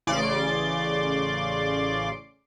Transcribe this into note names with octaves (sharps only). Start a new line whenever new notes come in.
A1 C#3 D5 C6 D6